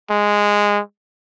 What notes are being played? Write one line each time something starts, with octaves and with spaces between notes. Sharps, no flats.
G#3